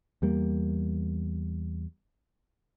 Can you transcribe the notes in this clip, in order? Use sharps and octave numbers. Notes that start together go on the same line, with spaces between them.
E2 G3 A#3